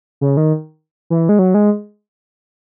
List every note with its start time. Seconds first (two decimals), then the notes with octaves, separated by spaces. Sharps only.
0.21 C#3
0.37 D#3
1.10 E3
1.29 G#3
1.39 F#3
1.54 G#3